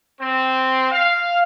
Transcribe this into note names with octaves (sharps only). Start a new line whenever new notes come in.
C4
F5